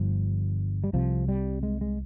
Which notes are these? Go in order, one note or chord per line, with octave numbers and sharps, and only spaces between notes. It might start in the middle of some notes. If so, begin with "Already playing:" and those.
Already playing: G1 G2 F3
G3
C2 C3 F3
G3
G#3
G#3